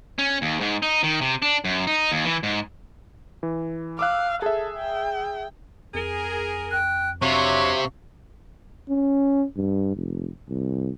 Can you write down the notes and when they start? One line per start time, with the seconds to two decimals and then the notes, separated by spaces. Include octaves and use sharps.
0.19 C#4
0.42 D#2
0.61 G#2
0.82 D#4
1.04 D#3
1.21 C3
1.42 D4
1.65 F#2
1.87 D#4
2.11 D#2
2.25 E3
2.43 G#2
3.43 E3
3.99 F5 D6 E6 F#6
4.42 G#4 A4 E5
4.78 G5
5.94 F2 G#4 A#4
6.71 G5 F#6
7.22 C3 F#3 D4 C#5 E5 F5 C#6
8.89 C#4
9.56 G2
9.96 F1
10.49 C2